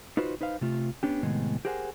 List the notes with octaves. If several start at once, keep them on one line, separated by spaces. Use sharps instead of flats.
D#4 F4 F#4 B4 C5
D#4 B4 C5 F5
C3 A3 F4
B3 C#4 D4 G4
A2 C3 D#3 G#3 B3
G4 G#4 A#4 C5 F#5 G#5